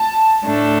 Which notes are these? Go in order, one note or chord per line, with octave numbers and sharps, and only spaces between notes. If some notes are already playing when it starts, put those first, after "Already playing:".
Already playing: A5
A2 A3 D4